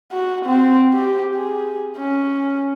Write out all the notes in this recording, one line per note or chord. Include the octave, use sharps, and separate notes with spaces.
F#4
C4
G4
G#4
C#4